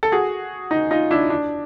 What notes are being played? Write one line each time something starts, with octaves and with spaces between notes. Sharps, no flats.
A4
F#4 G#4
D#4
D#4 F4
D4 E4
D4